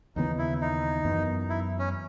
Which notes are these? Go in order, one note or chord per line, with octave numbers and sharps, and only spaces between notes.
D#2 C#3 E3 B3 D#4
E4
D#4
F#2 E3 B3
E4
C#4